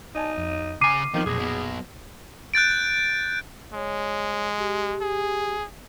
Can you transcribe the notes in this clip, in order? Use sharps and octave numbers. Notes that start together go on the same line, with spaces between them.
D#4 D5 G#5 A5
F2
C#3 G#5 A#5 D6 D#6 F6 C7 D#7
D#3 F3 B3 C4 D#4
B1 F2 A#2 G#4 A#6
F#3 B3
F#6 G6 A6 D7
G#3 C#5
G4
G#4